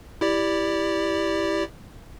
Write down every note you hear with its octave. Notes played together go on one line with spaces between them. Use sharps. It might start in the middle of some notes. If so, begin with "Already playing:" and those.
E4 G4 D5